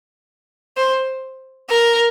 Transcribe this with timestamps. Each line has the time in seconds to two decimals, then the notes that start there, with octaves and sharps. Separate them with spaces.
0.77 C5
1.70 A#4